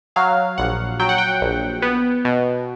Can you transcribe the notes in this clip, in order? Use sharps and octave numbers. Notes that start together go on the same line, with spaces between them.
F#3 F5
A#1 F#5
F#3 G5
F#5
G5
A#1
B3
B2